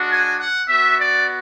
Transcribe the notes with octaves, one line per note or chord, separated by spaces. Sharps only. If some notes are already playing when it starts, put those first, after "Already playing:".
Already playing: G#3 D4 F#4
G#5
F#5
B3 F#4 E5
D5